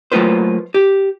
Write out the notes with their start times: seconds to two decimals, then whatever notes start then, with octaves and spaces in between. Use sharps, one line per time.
0.12 F#3 A3 A#3 F4 B4 C5
0.74 G4